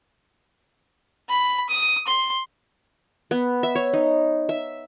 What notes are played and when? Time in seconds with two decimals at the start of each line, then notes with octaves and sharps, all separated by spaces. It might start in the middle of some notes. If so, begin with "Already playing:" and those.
1.29 B5
1.69 D#6
2.07 C6
3.31 B3
3.63 E5
3.75 C#5
3.94 D#4
4.49 E5